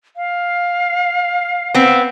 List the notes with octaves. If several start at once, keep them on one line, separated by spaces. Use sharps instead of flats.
F5
B3 C4